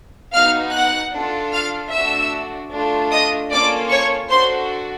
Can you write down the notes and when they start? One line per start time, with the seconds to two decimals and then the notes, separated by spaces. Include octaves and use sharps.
0.34 B3 D#4 F#4 F5 F6
0.73 F#5 F#6
1.14 D4 F4 A4
1.52 F5 F6
1.92 A3 D4 F#4 E5 E6
2.72 A3 D4 F4
3.11 D#5 D#6
3.50 A#3 C#4 F4 A4 D5 D6
3.90 C#5 C#6
4.29 D4 F#4 A4 C5 C6